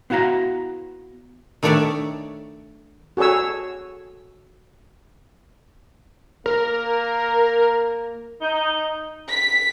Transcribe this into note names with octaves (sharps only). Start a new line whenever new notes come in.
B3 E4 F#4 F5 A#5
D#3 A3 D4 C#5 D5 E5
F#4 G#4 A4 C#5 E6
A#3 A#4
D#4
B6